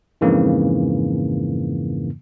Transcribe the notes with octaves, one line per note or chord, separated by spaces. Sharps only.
F2 G#2 C#3 E3 A#3